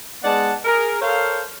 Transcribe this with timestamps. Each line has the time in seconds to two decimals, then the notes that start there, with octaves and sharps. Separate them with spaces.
0.24 G#3 B3 D#4 D5 F#5 A5
0.65 G#4 A#4
1.02 A4 A#4 C5 C#5 F5